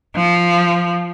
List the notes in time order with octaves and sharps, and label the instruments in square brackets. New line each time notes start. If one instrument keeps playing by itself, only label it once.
[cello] F3